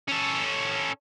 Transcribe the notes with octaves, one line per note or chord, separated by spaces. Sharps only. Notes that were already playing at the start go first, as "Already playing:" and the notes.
C#4 A4